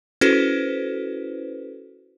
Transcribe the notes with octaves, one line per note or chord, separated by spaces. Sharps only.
C#4 E4 F#4 A4 B4 C5